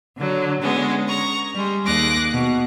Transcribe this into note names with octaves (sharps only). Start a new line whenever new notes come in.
D3 F#3
D3 G#3 B3 C#4
A#5 C#6
G3 G#3
D#2 G#4 D6 F#6 A#6
B2